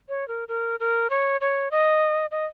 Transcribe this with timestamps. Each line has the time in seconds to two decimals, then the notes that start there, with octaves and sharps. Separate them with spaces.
0.09 C#5
0.28 A#4
0.48 A#4
0.80 A#4
1.10 C#5
1.41 C#5
1.71 D#5
2.31 D#5